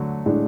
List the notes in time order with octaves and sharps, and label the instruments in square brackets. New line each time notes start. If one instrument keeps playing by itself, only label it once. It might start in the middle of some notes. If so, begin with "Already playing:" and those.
Already playing: [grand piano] D3 F#3 A3
[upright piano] A2 G#3 D4